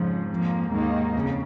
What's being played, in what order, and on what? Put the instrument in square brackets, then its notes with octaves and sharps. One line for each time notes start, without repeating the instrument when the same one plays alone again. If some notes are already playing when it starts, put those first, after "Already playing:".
Already playing: [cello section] F2 C#3 F3 [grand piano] G#2
[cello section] F2 F3 A#3
[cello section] D#2 D#3 A#3 D#4 [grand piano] G#2
[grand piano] F2 [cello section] C#3